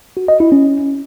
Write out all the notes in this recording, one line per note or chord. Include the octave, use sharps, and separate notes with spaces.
F#4
D#5
E4
C#4